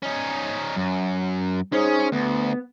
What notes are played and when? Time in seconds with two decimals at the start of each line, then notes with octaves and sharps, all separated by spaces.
0.02 C#4 D#4
0.76 F#2
1.72 C#4 D#4 G#4 C5
2.12 D2 B3